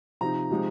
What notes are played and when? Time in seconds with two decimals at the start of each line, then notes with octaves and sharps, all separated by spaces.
0.21 C3 F3 C4 D#4 A#5
0.51 C3 F3 G#3 D#4